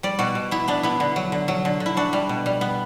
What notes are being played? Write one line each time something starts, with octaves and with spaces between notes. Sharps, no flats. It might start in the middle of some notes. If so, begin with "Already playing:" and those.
G3 D5
B2 F#4
B2
B3 E4
B3 D4
B3 E4
D3
F#3
D3
F#3
D3
D3
E4
D4 F#4
G3
B2
G3
B3